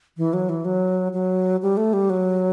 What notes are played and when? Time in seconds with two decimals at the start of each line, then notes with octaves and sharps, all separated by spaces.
0.17 E3
0.33 F#3
0.49 E3
0.65 F#3
1.13 F#3
1.62 G3
1.77 A3
1.93 G3
2.10 F#3